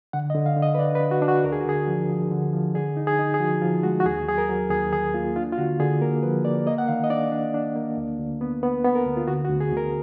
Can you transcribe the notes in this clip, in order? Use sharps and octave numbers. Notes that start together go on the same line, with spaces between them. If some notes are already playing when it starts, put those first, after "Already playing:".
D3 F#5
D#5
D3
F5
D3
D#5
B4
D4 D5
B4
D4
F#4
D4
F#4
D2 A#4
G#4
F#4
D3 G#4
F3
F3
D3
F3
D3 G#4
D#4
G#4
D#4
G#4
F3 F#4
F3 F4
G#3 F#4
F#4
D#2 G#4
F#3 G#4
A#4
F#3
D#2 G#4
D#3 G#4
A#3 F4
D4 F4
F4
D3 F#4
D3 G#4
A#3 A#4
F3 B4
A#3 D5
A#3 D#5
F#5
D#3 F5
D#5
D4 D5
D4
D4
A#3
D2
D2
B3
B3 B4
B3
A#4
D2
F4
D3 F#4
F#4
D2
G#4
D2
A#4